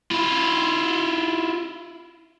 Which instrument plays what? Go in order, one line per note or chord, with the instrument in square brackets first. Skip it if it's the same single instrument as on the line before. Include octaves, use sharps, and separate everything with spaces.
[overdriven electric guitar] E4 F4